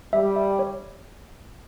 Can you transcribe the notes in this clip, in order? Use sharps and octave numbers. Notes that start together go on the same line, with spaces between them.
G3 E5
E5
C#5